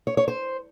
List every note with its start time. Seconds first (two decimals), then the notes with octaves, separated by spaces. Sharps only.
0.07 C#5
0.17 C#5
0.28 C5